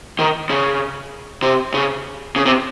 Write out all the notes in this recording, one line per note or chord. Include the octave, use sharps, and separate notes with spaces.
D#3
C#3
C3
C#3
C#3
C3